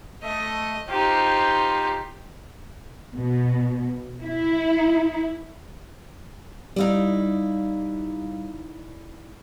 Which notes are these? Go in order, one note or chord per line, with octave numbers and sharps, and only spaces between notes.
A3 D#5
D#4 F4 G4 C5
B2
E4
G3 D#4 E4 D5 F5